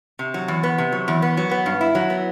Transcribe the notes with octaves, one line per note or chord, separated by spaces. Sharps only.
C3
F#3
E2
B3
C3
F#3
E2
B3
F#3
B3
G2
E4
F#3
B3